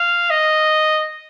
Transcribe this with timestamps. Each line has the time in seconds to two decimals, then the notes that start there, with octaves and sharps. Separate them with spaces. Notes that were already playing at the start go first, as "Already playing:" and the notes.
Already playing: F5
0.30 D#5